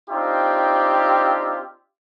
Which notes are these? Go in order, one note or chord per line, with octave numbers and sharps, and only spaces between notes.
C4 D4 D#4 F4 G4